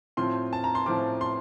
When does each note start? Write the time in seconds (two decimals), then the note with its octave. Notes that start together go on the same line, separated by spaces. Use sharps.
0.17 A2 F3 C4 F4 C6
0.53 A5
0.64 A#5
0.75 C6
0.86 A2 F3 C4 F4 D6
1.21 C6